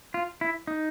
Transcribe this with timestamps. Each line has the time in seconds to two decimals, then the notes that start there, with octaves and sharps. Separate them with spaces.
0.14 F4
0.41 E4
0.67 D#4